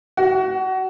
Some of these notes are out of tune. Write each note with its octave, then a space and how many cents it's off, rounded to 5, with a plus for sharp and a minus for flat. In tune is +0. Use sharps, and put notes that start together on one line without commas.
F#4 +25